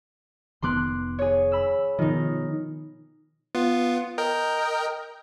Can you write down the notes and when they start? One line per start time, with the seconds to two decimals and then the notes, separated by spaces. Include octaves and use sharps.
0.62 F1 D#3 B3 C6 D6 F#6
1.19 G#4 C#5
1.52 B5 E6
1.99 B2 D#3 F3 D#4
3.55 B3 F4
4.18 A#4 D#5 G5